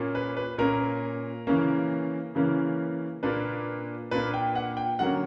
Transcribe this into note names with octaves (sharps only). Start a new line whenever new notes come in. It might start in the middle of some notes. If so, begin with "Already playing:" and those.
Already playing: A#2 A#3 C#4
B4
B4
A#2 A#3 C#4 A#4
C#3 E3 A#3 C#4
C#3 E3 A#3 C#4
A#2 A#3 D4 B4
A#2 A#3 D4 B4
G5
F#5
G5
D3 F#3 A#3 C#4 F#5